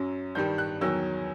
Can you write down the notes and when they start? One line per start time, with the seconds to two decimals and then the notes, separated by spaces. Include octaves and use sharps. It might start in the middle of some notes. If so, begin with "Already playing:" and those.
Already playing: F#2 F#3
0.35 G2 D#3 G3 G6
0.58 F#6
0.81 E2 D#3 F#3 E6